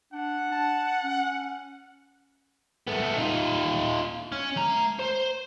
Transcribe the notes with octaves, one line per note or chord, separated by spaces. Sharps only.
D4 F#5
A5
C#4
A3 B3
D#4 F4
C#4
A3 A#5
C5